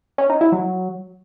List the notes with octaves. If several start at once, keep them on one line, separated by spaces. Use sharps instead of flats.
C#4
D#4
E4
F#3